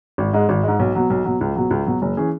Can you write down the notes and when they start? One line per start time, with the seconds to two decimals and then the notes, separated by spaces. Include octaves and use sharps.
0.18 G#1
0.33 G#2 G#3
0.49 G#1
0.63 G#2 G#3
0.79 B1
0.95 B2 F#3
1.10 B1
1.25 B2 F#3
1.41 C#2
1.56 B2 F#3
1.71 C#2
1.86 B2 F#3
2.02 F#1
2.17 E3 C#4 G#4